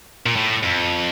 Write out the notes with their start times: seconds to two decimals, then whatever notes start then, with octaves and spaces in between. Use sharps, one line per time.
0.26 A#2
0.36 A2
0.63 F2